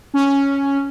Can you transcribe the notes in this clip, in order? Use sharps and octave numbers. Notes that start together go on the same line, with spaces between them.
C#4